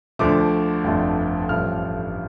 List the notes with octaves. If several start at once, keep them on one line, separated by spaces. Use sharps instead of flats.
D2 D3 F3 A3 D6
G1 F2 D3 F3 A3
A1 G2 F3 A3 F6